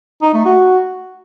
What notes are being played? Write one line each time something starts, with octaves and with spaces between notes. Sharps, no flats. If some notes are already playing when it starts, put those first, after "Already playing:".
D#4
A3
F#4